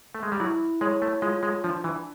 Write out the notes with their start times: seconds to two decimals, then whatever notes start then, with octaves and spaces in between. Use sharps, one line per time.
0.15 A3
0.23 G#3
0.32 G3
0.40 F#3 E4
0.81 G#3 C#5
1.02 A3
1.22 G#3 F4
1.43 G#3
1.64 F3 D4
1.84 E3